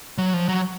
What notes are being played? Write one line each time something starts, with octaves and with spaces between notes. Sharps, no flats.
F#3
F3
F#3